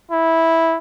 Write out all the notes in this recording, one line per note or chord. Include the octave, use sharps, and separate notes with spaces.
E4